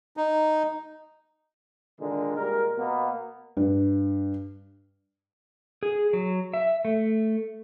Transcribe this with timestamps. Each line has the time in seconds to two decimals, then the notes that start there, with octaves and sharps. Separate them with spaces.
0.17 D#4
2.00 A#2 D3 D#3 G#3 A#4
2.36 A#2 G3 G#3 A#4
2.78 B2 A#3 B3
3.57 G2
5.83 G#4
6.13 F#3
6.54 E5
6.85 A3